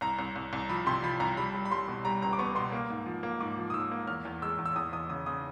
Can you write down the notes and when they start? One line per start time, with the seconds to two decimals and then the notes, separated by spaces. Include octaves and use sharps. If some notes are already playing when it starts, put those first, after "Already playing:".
0.01 C2 A#5
0.19 C2
0.36 C2
0.53 C2
0.69 F3 B5
0.86 C3 C6
1.03 F3 B5
1.20 C2 A#5
1.37 G3 B5
1.54 G3
1.65 B5
1.71 G3 C6
1.88 B2
2.05 G3 A#5
2.22 C#2 A#5
2.33 D6
2.39 B3 C#6
2.55 B2 C6
2.72 A#3
2.90 G#2
3.06 F3
3.23 A#3
3.41 G#2 D6
3.57 F3
3.70 D#6
3.74 G#2 E6
3.92 A#3
4.07 E2 F6
4.25 E2
4.42 G#3 E6
4.58 E2
4.66 E6
4.76 E2 D#6
4.93 E2 D#6
5.10 C#3 D#6
5.26 C#3 D#6